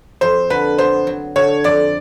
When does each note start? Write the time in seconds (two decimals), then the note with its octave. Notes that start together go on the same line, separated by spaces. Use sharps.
0.21 F2 C5
0.50 D3 B4
0.78 B3 C5
1.07 F#3
1.36 D3 C#5
1.64 F2 D5